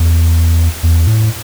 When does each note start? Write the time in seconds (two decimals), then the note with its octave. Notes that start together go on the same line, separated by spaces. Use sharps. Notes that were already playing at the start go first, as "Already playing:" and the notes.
Already playing: E2
0.83 E2
1.07 A2